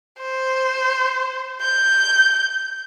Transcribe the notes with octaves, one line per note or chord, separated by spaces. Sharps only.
C5
G6